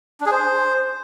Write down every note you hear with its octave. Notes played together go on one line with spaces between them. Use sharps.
D4
G#4
C5